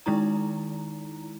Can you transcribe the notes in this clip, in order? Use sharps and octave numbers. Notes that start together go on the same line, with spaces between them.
D#3 G#3 D#4 E4 A#5